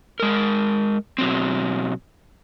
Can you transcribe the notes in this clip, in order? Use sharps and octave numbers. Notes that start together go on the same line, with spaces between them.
G#3 A#4
B2 F#3 C4